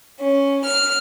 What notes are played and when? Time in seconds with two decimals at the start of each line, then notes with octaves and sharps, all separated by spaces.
0.21 C#4
0.66 F6